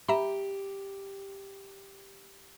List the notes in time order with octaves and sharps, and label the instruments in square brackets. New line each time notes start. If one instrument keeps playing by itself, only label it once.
[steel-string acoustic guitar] G4 [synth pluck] E5 A#5 B5